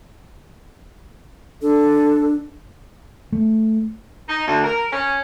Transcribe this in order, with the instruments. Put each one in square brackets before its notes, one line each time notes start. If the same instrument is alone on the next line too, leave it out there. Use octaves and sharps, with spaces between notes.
[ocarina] D4 [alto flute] A4
[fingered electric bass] A3
[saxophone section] D#4
D2
A#4
C#4